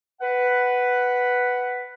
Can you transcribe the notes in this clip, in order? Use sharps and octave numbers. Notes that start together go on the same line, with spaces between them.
B4 F#5